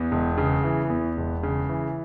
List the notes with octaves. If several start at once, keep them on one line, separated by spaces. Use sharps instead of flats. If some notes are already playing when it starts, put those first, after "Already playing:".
Already playing: E2 B3
E1
C#3
E3
E2
E1
C#3
E3